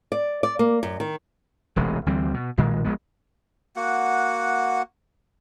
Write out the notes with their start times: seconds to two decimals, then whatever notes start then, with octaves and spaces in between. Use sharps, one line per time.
0.12 D5
0.43 D5
0.59 A#3
0.83 F#2
1.00 D#3
1.76 E1 A1 C3 G#3
2.06 D2 E3 G3 C4
2.34 B2
2.57 B1 A#2 D#3 G#3
2.85 A#1 G#3 B3
3.76 A#3 F#4 F#5